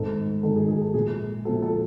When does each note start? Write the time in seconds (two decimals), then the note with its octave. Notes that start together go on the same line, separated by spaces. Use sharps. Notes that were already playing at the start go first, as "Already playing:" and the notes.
Already playing: G#1 G#2 D#3 G#3 A4
0.43 G#1 G#2 D#3 G#3 A4
0.56 G#4
0.69 G#4
0.81 A4
0.94 A#1 A#2 F3 A#3 G#4
1.45 A#1 A#2 F3 A#3 A4
1.62 A4